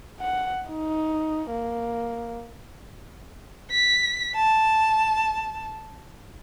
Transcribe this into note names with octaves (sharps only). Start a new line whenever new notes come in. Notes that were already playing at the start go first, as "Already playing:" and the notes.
F#5
D#4
A#3
B6
A5